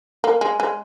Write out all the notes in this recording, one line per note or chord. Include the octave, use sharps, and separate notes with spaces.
A#3
G#3
G#3